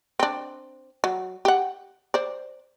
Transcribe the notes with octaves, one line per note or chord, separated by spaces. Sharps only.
C4 D4
F#3
G4 F#5
C5 D5